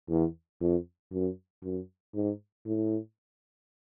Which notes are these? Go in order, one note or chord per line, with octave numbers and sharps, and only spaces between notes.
E2
F2
F#2
F#2
G#2
A2